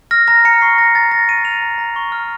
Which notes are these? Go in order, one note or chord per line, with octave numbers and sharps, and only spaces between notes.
F6 A#6
A#5 A#6
A#5 C#7
C#6 C7
F6 A#6
A#5 A6
A#5 A#6
C#6 D#7
F6 F7
A#5
A#5
C#6
F6